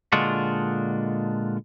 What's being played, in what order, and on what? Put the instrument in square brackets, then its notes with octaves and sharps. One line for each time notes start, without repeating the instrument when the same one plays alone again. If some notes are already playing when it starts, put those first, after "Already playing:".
[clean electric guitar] A#2 D3 G#3 D4 F4 F#4